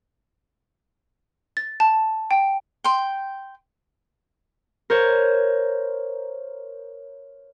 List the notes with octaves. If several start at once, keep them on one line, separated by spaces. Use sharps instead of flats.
A6
A5
G5
G5 C6
A#4 C5 C#5